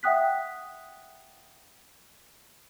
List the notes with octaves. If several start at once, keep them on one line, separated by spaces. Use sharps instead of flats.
E5 F#5 G5 D#6 F#6 B6